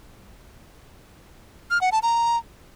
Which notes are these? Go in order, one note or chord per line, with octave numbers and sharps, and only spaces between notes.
F6
F#5
A5
A#5